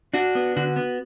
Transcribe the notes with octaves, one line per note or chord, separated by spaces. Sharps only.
D4 F#4
B3
D3 F#4
B3